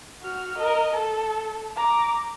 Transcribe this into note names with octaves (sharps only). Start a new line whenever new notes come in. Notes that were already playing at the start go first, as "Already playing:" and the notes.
F#4 F6
A#4 D#5
A4
A#5 D6